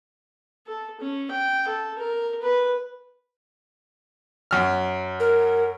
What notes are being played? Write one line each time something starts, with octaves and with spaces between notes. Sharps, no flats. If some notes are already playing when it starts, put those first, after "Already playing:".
A4
C#4
G5
A4
A#4
B4
F#2 F6
A#4